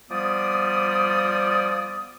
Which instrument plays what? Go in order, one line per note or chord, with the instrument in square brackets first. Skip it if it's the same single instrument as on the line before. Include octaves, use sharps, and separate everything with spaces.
[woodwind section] F3 G3 B3 D5 D#6